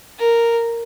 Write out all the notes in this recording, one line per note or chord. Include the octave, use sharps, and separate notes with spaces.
A#4